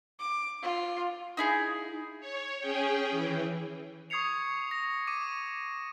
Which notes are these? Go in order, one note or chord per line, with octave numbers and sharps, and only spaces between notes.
D6
F4
D#4 E4 G#4
C#5
C#4 G#4 G5
E3
C#6 D#6 G#6 C7 C#7 F7
A#6
D6 D#7